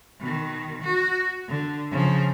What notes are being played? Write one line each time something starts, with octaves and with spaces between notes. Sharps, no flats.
B2 D#3
F#4
D3
C#3 F3